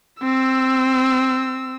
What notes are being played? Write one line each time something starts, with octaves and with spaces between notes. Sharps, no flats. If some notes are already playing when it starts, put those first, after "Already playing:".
C4 E6